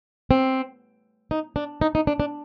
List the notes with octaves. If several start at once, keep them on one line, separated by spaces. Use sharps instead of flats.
C4
D#4
D4
D#4
D#4
D4
D4